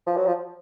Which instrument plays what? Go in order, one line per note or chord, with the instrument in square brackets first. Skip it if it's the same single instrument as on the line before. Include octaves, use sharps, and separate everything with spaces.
[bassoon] F3
F#3
F3